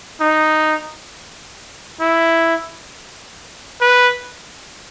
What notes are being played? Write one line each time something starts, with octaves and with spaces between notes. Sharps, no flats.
D#4
E4
B4